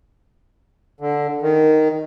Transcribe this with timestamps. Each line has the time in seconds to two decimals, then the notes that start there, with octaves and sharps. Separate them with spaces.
1.00 D3
1.42 D#3